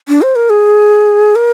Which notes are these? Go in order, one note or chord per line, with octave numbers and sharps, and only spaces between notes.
D4
C5
A#4
G#4
A#4